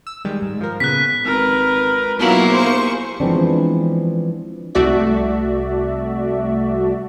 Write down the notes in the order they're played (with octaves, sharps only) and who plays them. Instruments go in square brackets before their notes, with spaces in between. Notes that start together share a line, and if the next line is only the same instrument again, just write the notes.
[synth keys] E6
D#3 G3 G#3
G#2
F3 A#4
[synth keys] A#2 C#3 B3 [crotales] F#6 B6
[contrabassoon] G#1 [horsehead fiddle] A#4 B4
[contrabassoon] B1 [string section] F#3 [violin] A#3 E4 [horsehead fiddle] F4
[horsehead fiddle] G4 G#4 [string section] C5 C#6
[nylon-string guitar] E3 F3 G#3 B3 C4 D4
[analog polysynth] C2 A3 F#4 D5 E5